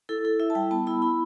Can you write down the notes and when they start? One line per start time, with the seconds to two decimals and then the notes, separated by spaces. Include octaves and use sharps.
0.09 E4 A4
0.25 E4 A4
0.39 E4 E5
0.50 A5
0.55 G3 G5
0.71 B3 A5
0.87 E4 B5
1.02 E4 B5